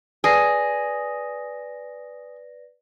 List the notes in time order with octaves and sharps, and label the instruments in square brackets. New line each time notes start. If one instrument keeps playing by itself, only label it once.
[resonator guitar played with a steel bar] G#4 [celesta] B4 D5 A#6